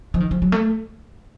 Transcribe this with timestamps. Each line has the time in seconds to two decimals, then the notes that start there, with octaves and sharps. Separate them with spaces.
0.14 F3
0.20 D#3
0.31 F3
0.42 F#3
0.52 A3